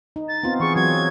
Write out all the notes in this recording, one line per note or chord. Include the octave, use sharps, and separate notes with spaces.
D#4
A6
B3 C4 F4
E3 G#4 C#6
F#3 C4 F#4 G#6